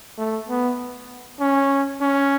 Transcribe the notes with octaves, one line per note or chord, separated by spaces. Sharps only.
A3
B3
C#4
C#4